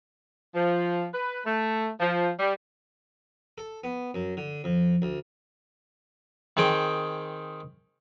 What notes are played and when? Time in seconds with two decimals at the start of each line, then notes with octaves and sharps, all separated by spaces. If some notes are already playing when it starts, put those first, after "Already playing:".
0.55 F3
1.13 B4
1.45 A3
2.00 F3
2.40 G3
3.58 A4
3.84 B3
4.14 F#2
4.37 D3
4.64 F2
5.02 D2
6.57 D#3 C4 G#4 G5